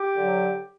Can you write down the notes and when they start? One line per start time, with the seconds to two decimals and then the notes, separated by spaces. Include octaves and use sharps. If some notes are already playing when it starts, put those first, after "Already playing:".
Already playing: G4
0.16 D3 F#3